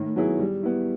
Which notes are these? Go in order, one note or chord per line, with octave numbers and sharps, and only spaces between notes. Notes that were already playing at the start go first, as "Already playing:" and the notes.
Already playing: A2 D#3
F#3 B3 E4 G#4
G3
B3 E4